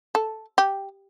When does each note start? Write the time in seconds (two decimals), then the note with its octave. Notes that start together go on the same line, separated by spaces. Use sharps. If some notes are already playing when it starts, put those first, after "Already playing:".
0.15 A4
0.58 G4